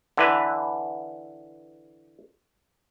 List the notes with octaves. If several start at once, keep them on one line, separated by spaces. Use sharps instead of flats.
D3 E3 B4